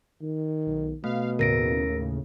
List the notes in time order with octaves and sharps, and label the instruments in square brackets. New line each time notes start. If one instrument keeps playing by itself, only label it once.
[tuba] D#3
[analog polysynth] B1
[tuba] B2 [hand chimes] A3 [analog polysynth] F5
[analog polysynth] D#2 A2 C#3 [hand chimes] A#4 A#6 D7